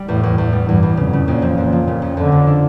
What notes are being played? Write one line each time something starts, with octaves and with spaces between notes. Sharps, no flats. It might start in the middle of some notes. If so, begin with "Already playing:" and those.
Already playing: G3
E2 A2
E2
E2
G3
E2 G2
E2
F2 C#3
C#3
F2 A#2
F3
F2 A#2
F3
A#2 C#3
F2
F2 D3
F2
D4